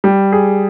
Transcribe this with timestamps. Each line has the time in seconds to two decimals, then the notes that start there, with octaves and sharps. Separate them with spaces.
0.04 G3
0.33 G#4